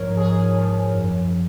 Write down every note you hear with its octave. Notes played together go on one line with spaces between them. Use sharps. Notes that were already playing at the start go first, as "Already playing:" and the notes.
Already playing: G#2 F3 A#4 C#5
G#2 G#4
F3
F#2